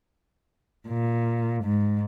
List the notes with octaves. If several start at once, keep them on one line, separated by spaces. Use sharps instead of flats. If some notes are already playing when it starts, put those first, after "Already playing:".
A#2
G#2